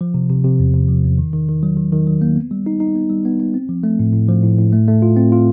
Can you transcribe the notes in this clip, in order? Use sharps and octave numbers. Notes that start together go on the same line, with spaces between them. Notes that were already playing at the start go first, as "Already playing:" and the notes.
F3
C3
C3
C3
E2
C3
F3
E2
D#3
D#3
D#3
F#3
D#3
D#3
F#3
A#3
B3
G3
D#4
D#4
B3
G3
B3
B3
C4
F3
A3
A2
A2
F3
A2
A2
A3
A3
F4
C4
F4